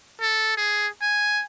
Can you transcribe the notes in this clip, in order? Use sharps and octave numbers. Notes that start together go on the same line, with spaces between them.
A4
G#4
G#5